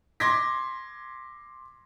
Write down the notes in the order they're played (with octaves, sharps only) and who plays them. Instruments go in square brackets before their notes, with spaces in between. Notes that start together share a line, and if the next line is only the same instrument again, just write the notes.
[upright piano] C6 D6 G#6 A#6 B6